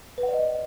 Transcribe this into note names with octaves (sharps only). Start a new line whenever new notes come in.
B4
F#5
D5
D#5